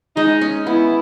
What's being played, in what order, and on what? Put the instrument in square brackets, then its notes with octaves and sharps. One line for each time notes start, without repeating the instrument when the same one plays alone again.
[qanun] G#3 [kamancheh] D#4
[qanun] C#4
[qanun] B3 [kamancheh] E4